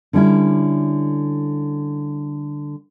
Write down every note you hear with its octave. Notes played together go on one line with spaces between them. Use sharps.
D3 G3 C#4 E4